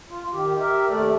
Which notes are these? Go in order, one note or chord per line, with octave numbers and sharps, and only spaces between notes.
F4
D#3 G4
G4 A#4 E5
D#2 C3 A3 A4 D5